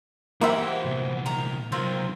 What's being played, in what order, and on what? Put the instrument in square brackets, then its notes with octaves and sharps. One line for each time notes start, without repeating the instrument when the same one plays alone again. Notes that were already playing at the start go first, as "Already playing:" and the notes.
[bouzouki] E3 C5 F#5 [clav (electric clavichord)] A#3 E4 E5 [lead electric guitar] F#4 G4
[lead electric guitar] C2 A#2
[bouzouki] D#3 A#5
[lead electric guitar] C2 F#3 [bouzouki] C4 F4 A#4